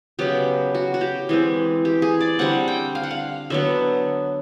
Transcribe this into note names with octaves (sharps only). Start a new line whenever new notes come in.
C#3 F#3 B3 G4
F#4
F#4
G4
E3 G#3 C4
G4
G#4
D5
D3 G3 C4 F#5
G5
F5
F#5
F5
D3 F#3 B3 E5